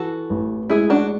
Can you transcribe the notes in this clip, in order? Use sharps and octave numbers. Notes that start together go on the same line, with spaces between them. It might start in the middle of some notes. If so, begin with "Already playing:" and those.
Already playing: E3 F#4 A4
A1
G#3 E4 G#4
D4 F#4